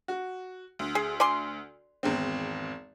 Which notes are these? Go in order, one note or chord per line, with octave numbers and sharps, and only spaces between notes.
F#4
D2
G#4
D5 G#5 C6
G#1 E2 C4